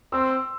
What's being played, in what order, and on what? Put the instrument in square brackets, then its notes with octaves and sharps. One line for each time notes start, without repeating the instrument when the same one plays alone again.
[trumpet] C4 [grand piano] C6 E6